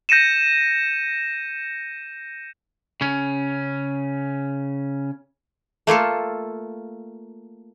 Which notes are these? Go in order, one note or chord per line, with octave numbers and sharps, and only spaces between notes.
G6 A#6 C#7 D#7 E7
C#3 C#4
A3 A#3 F4 A4